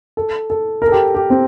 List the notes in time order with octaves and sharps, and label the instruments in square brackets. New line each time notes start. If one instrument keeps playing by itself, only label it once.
[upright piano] A4
A4
A#4
A4
G4
G4
C4